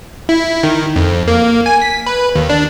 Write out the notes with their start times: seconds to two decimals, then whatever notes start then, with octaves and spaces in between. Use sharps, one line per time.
0.29 E4
0.63 D#3
0.96 F2
1.28 A#3
1.66 G#5
1.82 B6
2.07 B4
2.35 D#2
2.50 D4